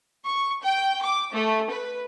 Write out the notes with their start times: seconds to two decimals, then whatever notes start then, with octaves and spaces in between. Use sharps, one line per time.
0.24 C#6
0.62 G5
1.02 D6
1.32 A3
1.70 B4